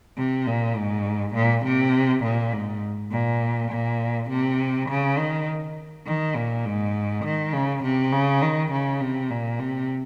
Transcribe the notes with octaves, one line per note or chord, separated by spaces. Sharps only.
C3
A#2
G#2
A#2
C3
A#2
G#2
A#2
A#2
C3
C#3
D#3
D#3
A#2
G#2
D#3
C#3
C3
C#3
D#3
C#3
C3
A#2
C3